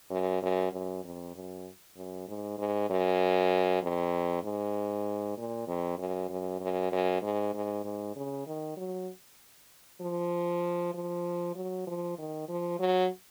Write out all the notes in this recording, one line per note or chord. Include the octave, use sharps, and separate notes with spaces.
F#2
F#2
F#2
F2
F#2
F#2
G#2
G#2
F#2
F2
G#2
A#2
F2
F#2
F#2
F#2
F#2
G#2
G#2
G#2
C#3
D#3
F#3
F3
F3
F#3
F3
D#3
F3
F#3